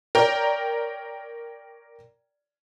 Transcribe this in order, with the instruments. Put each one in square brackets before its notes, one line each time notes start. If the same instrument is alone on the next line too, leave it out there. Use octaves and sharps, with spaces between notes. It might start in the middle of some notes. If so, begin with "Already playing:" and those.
[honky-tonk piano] A#4 C#5 D5 G5